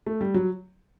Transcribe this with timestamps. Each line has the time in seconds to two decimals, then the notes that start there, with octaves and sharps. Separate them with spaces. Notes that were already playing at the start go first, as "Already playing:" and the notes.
0.06 A3
0.21 G3
0.34 F#3